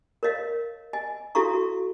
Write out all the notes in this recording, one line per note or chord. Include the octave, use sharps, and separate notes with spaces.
A#4 C#5 D#5 F5
D#5 G#5
E4 F#4 A4 F5 A#5 C#6